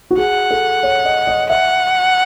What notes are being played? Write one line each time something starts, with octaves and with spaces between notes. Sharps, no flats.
F#4
G#4 F#5
A4
C#5
D#5
D#5
E5 F#5